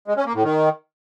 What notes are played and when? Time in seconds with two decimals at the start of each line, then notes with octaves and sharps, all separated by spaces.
0.08 G#3
0.17 C#4
0.26 A#3
0.35 A2
0.44 D#3